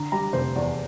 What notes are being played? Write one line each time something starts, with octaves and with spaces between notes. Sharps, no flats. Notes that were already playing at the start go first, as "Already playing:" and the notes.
Already playing: D3 A#5
G3 A#5
F1 C5
E2 D5